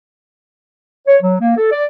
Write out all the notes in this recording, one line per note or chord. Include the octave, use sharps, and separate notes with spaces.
C#5
F#3
A#3
A4
D5